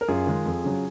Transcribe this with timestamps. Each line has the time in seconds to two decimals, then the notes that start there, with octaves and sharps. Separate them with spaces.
0.01 A#4
0.08 F#2 F4 G#4
0.27 D#3 G#3
0.46 F2
0.64 C#3 F#3